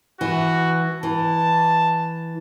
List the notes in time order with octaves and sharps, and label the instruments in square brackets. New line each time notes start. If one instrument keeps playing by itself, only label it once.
[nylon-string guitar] E3 [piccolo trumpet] F#4
[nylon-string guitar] E3 [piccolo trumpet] A5